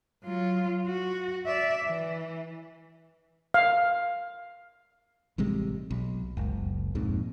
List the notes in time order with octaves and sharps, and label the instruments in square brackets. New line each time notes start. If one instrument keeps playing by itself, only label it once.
[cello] F#3 F4
F#4
D5 E5
E3
[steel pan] F5
[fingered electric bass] A1 C3 G3 G#3
B1
F#1 C#2
A#1 F2 G#2